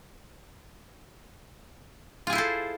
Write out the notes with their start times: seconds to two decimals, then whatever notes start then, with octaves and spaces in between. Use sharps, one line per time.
2.27 F4
2.30 G#4
2.33 E4
2.35 C5
2.38 A4